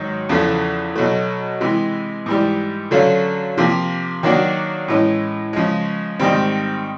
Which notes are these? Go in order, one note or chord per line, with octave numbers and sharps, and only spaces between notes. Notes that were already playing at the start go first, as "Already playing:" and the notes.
Already playing: G#2 D#3 F#3
E2 C#3 F3 A3
B2 F#3 A3
C3 E3 G#3
G#2 E3 G3
D3 F#3 A3 C#4 F4
C3 F3 A#3
D#3 F#3 A#3 D4 F#4
A2 E3 G#3 C#4
C#3 F3 G#3
G#2 D#3 G3 C4